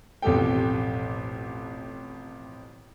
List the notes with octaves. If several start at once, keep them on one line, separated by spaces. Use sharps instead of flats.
A1 F2 B2 G4 A4 G5